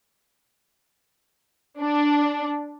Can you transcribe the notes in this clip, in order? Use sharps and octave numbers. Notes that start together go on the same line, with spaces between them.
D4